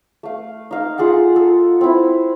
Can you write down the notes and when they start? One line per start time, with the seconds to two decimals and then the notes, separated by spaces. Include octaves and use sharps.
0.23 A3 F5
0.71 D#4 F5
0.98 F4 G#4 A4 F#5
1.36 A4
1.81 C4 E4